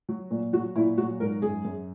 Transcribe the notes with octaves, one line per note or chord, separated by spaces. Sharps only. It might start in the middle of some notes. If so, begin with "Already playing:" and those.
F#3
A#2
F#3 F#4
A#2 E4
F#3 F#4
G#2 A#4
F#2 G#4
F#2